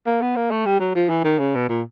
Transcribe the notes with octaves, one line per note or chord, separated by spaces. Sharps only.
A#3
B3
A#3
A3
G3
F#3
F3
E3
D#3
C#3
B2
A#2